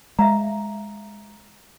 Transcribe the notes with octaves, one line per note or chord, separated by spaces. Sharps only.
G#3 E5 F5 A#5